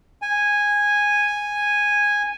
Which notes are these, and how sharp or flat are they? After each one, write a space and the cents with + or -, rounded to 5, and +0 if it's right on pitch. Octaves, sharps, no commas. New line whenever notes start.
G#5 -10